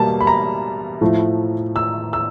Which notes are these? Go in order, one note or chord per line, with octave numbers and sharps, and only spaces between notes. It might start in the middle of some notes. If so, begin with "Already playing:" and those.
Already playing: B2 G3 A#3 A5
B5
A#5
A2 F3 A3
E6
E6